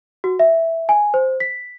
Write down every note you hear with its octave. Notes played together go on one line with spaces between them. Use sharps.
F#4
E5
G#5
C5
B6